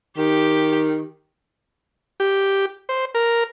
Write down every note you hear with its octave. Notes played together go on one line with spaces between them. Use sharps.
D#3 G4
G4
C5
A#4